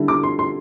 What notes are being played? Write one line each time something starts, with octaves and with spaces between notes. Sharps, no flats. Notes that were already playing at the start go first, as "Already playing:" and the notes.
Already playing: D3 G3 E4
D6
C6
C6